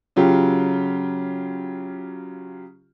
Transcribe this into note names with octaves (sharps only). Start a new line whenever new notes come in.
C#3 F#3 F4 G4